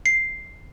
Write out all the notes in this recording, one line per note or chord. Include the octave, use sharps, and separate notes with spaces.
C7